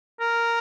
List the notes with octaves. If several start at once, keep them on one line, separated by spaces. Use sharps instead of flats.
A#4